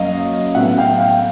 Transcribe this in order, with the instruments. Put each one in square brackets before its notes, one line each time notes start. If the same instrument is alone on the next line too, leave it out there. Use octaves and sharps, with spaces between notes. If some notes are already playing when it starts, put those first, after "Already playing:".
Already playing: [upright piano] F#2 F#3 A#3 D#5 F5
A2 F#3 B3 E5 F#5
F5 G5
F5 G5